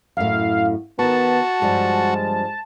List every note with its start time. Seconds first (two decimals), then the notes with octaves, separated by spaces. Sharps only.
0.17 F#2 A2 F5
0.99 D#3 B3 F#4 B4 A5
1.62 G2 F3 G3 G#3